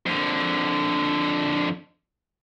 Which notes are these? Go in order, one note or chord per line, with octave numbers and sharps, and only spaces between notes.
F2 D3